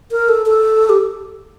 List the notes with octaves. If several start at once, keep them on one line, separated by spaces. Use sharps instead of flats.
A#4
A4
A4
G4